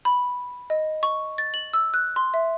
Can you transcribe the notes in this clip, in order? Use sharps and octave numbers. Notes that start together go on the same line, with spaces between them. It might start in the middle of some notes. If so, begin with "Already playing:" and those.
B5
D#5
C#6
A6
F#7
E6
F#6
C6
E5